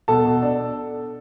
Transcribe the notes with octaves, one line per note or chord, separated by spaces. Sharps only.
B2 A4 A5
B2
D4